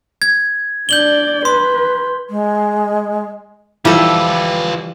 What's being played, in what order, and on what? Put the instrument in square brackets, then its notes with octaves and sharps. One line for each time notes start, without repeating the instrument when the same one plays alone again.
[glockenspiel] G#6
[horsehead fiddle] D4 D5 [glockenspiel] G6 F#7 G7
[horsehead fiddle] B4 [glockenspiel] C6
[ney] G#3
[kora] E3 F3 [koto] G3 A4 [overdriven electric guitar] F4 B4